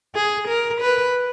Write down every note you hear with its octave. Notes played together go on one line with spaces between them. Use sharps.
G#4
A#4
B4